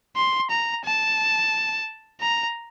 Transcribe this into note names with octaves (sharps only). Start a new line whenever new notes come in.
C6
A#5
A5
A#5